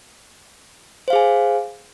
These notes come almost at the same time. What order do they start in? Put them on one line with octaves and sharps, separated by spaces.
C5 F5 G#4 G#5